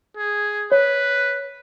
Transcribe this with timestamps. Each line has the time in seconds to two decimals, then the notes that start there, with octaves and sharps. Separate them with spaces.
0.17 G#4
0.72 B4 C#5